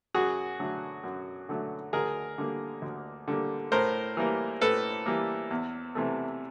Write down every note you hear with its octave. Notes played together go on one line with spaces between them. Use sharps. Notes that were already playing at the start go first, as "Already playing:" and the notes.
F#2 F#4 G#4
D3 F#3 A3
F#2
D3 F#3 A3
D2 G#4 A#4
D3 G3 A#3
D2
D3 G3 A#3
A2 A#4 C5
E3 G3 A#3
A2 A4 B4
E3 G3 A#3
E2
C3 E3 A3